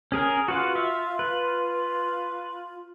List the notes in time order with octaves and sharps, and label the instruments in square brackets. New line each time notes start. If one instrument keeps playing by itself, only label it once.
[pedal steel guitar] C#4 G#4 A#4
[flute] F4 [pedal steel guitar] F#4 B4 F5
[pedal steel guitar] E5 F5
B4